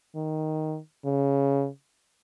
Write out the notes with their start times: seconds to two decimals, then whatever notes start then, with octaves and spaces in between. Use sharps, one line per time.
0.15 D#3
1.05 C#3